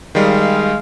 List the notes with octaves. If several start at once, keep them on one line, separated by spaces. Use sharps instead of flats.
D#3 G3 G#3 F5